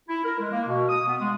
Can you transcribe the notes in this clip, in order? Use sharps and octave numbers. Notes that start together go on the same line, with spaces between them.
E4
A#4
G#3
A#3
B2
D#6
B3
G#3